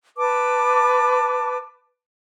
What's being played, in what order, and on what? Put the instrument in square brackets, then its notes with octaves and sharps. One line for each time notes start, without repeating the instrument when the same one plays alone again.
[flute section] B4 A5 D6